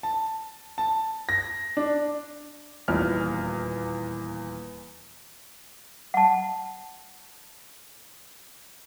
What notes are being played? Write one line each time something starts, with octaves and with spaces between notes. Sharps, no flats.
A5
A5
A#6
D4
D#1 E2 A#2 F6
F#5 A5